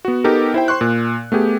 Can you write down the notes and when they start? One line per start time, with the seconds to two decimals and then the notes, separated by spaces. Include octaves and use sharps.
0.05 B3 F#4
0.24 B3 D#4 G4 A4 A#4
0.54 E4 C5 G5
0.68 C5 C6 C#6 F#6
0.81 A#2
1.32 A3 B3 G4 G#4